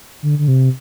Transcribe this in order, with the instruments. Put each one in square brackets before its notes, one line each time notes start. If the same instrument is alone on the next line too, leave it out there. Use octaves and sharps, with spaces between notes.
[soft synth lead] D3
D3
C3